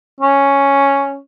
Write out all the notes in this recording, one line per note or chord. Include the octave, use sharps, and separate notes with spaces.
C#4